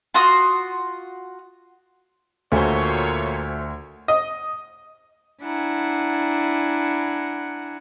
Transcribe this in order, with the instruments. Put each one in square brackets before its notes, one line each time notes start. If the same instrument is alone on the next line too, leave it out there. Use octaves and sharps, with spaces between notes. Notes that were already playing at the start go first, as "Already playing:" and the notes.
[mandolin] F4 F#4 C6 D#6
[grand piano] D2 F#4 G#5 [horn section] A#2 C#5 [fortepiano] A3 C5
[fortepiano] D#5
[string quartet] D4 E4 F#5 G#5 A#5